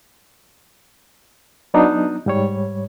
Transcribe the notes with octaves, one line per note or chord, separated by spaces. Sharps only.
F#3 B3 D4 D#4
G#2 G3 C#5